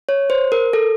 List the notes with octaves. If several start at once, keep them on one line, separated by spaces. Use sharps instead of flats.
C#5
C5
A#4
A4